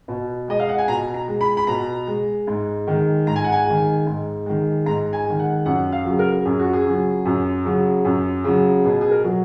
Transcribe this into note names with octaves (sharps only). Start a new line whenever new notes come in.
B2
G#3 D#5
F5
F#5
G#5
B2 A#5
A#5
G#3
B5
B5
B2 A#5
G#3
G#2
D#3 G#3
G#2 A#5
G#5
F#5
G#5
D#3 G#3
G#2
D#3 G#3
G#2 A#5
G#5
D#3 G#3
F#5
F#2 F#5
F5
C#3 F#3
A#4
F#2 G#4
F#4
G#4
C#3 F#3
F#2
C#3 F#3
F#2
C#3 F#3
B2 G#4
G#4
A#4
F#3